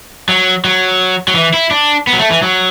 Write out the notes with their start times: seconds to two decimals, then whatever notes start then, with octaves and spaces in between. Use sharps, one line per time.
0.29 F#3
0.65 F#3
1.28 F#3
1.35 E3
1.54 E4
1.71 D4
2.07 B3
2.13 F#3
2.19 A3
2.31 E3
2.43 F#3